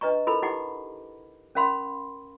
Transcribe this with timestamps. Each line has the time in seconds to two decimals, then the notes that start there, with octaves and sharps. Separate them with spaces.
0.01 D4 B4 D#5 A#5 C#6
0.27 E4 A4 A#4 B5
0.42 D#4 E4 G4 F#5 D6
1.55 C#4 A#4 F5 B5 C6